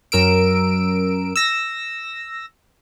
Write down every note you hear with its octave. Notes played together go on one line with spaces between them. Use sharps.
F#2 A#4 E6 D7
E6 A#6